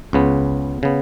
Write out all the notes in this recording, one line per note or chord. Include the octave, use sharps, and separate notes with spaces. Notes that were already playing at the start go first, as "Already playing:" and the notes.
C#2 C#3 B3
C#3 B3